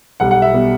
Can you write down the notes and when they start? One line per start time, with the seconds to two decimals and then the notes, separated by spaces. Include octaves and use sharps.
0.20 B1 B2 G3 F#5
0.31 F#5
0.42 E5
0.53 B2 G3